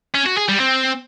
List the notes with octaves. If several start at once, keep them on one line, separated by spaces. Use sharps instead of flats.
C#4
F#4
G#4
G3
C4